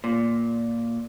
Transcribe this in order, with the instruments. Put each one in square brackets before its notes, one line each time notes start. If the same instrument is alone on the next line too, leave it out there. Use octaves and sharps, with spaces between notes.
[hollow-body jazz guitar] A#2